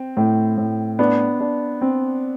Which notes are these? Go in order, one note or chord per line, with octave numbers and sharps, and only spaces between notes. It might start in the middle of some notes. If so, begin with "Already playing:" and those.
Already playing: C4
A2
A2
B3 D4
D4
C4